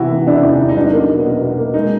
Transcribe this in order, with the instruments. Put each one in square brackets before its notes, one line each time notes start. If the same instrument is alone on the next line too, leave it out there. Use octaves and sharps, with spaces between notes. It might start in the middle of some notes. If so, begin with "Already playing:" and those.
Already playing: [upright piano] C3 E3 B3 E4 F#4
E3
C3 D4 E4
E2 D4
D#4
E2
D#4
F#3 D4
A#3
B2
B2
B2
A#3
G#3 D#4